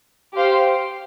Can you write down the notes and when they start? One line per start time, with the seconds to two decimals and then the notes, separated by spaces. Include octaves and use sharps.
0.34 G4 C5 F5